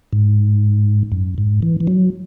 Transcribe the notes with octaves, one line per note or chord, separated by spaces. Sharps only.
G#2
F#2
G#2
E3
E3
F#3